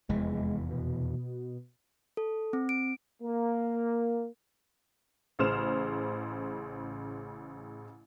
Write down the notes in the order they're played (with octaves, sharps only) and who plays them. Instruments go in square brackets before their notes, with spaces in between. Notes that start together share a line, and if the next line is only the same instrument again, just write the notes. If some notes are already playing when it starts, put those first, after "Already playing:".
[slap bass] F1 E2 E3 [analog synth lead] G#3
[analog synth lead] B2
[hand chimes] A4
C4
D7
[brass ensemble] A#3
[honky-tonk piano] A1 C#3 C5 F6 E7